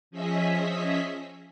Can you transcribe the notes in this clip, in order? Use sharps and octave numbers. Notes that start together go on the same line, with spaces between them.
F3 C#4 G#4 D#5 E5 B6